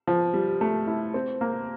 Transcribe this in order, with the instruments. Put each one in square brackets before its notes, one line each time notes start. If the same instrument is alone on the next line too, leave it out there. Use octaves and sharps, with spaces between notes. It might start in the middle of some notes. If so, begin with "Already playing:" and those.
[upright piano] F3
G3
A3
E4
C4
A#3